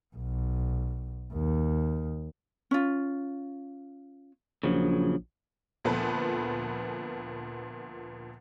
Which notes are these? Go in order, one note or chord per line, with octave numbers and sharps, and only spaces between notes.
B1
D#2
C#4 F4
A#1 C#3 F3 F#3
D2 A#2 F3 B3 A4 B4